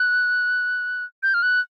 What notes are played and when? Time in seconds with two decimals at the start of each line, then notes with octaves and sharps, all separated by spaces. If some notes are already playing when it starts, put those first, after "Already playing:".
Already playing: F#6
1.23 G6
1.34 F6
1.43 F#6